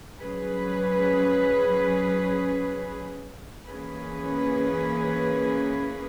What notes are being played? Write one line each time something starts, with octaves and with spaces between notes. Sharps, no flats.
F#3 C#4 G#4 B4
E3 A#3 C#4 G#4 B4